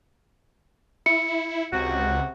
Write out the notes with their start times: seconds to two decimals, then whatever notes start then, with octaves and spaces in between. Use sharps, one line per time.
1.06 E4 C#7
1.73 C#2 C3 F#4